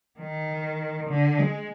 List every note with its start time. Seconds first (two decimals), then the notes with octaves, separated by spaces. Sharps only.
0.20 D#3
1.09 D3
1.38 G#3